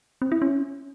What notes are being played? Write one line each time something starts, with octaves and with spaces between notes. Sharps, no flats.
C4
E4
C#4